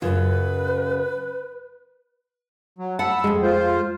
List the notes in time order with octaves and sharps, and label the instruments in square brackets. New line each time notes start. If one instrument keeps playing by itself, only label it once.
[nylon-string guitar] F#2 C#3 F4 [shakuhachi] B4
[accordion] F#3
[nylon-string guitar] F#5 [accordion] A5 B5 E6
[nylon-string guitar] F2 G#3
[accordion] F4 C5